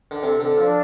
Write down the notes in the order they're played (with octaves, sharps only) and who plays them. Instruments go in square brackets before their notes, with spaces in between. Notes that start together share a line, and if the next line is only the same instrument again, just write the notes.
[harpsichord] D3
[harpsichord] C3 [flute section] A4
[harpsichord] D3 [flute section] A4
[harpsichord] F3 [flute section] D4